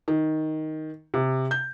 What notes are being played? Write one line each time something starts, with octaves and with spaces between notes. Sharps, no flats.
D#3
C3
G6